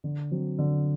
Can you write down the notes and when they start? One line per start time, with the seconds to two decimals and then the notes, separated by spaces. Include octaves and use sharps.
0.04 D3
0.32 F#3 C4
0.59 D3